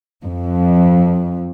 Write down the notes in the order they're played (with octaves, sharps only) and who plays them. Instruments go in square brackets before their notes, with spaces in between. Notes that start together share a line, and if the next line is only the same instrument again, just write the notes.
[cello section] F2